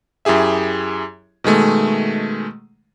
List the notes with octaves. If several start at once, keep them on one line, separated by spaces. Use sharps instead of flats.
F#2 E4 G4 G#4 E5
B2 D#3 G#3 A3